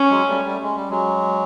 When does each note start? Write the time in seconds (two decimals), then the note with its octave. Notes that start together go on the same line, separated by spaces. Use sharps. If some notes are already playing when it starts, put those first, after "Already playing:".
Already playing: C#4
0.10 F#3 G#3
0.28 G3 A3
0.45 G3 A3
0.63 G#3
0.76 G3
0.90 F#3 G#3